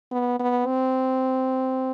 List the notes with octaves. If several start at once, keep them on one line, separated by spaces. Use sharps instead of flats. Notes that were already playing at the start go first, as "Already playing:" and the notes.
B3
B3
C4